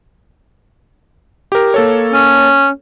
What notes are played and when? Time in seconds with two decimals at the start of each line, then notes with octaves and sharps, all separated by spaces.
1.52 G4 A#4
1.74 A#3 A4 C#5
2.13 C#4